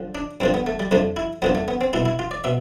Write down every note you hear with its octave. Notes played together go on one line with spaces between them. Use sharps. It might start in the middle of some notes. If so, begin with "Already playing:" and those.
Already playing: D3 F3
D4
G2 D3 F3 C4
B3
A3
G3
F2 D3 F3 A3
E4
F2 D3 F3 B3
A3
B3
C4
C2 B2 E4
E4
F4
D5
B2 E5